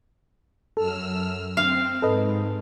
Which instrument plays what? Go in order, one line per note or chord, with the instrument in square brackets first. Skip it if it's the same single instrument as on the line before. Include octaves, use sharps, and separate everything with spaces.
[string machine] F#2 E6 F6 [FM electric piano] A4
[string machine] C4 [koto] F5 [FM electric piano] C7
[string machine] G#2 [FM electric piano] A4 B4 D#5